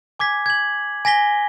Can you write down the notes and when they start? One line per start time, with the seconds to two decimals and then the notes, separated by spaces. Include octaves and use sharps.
0.19 G#5 D6 G#6 B6
0.46 G#6 F#7
1.05 G#5 A#6 B6 G7